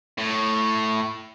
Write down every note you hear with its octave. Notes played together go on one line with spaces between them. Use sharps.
A2